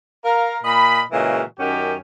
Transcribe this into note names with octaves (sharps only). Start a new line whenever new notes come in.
A#4 F5
A#2 D#5 B5
A#2 C#3 E3 G#3 F#4
F#2 D#3 C#4 F#4 G4